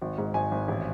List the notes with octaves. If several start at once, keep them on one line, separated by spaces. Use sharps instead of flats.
G#1
G#2
G#1 G#5
G#1
A1